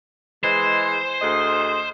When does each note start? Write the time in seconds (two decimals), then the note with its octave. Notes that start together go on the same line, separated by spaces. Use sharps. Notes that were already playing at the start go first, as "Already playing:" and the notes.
0.43 E3 G#3 C5
1.20 D2 G#4 D#5